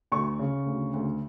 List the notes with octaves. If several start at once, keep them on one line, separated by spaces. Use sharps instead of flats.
D2 C#6
C#3
D2
D2